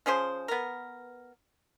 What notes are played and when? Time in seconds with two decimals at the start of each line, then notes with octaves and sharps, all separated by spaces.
0.06 F3 C#4 G#4 C5
0.48 B3 A#4